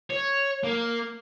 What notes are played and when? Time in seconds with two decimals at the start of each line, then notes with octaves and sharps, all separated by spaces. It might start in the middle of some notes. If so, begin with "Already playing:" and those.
0.10 C#5
0.64 A#3